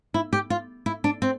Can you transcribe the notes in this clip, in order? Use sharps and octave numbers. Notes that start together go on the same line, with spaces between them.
E4
G4
F4
E4
D4
C4